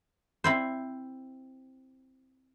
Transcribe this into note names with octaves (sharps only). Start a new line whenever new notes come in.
C4 E4 C5